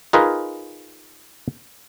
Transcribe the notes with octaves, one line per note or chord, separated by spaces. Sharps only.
D#4 F4 G#4 A#4 B4